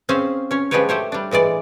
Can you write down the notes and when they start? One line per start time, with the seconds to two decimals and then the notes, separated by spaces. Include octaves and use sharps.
0.09 C4 C#4 G#4 C5 F5
0.51 C#4 C#5
0.71 F3 G#3 D4 G4 B4 C#5
0.89 A3 G4 C5 C#5
1.12 G3 D4
1.31 A2 E3 G#3 D5